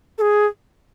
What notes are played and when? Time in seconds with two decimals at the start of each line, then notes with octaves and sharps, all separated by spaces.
0.18 A4
0.21 G#4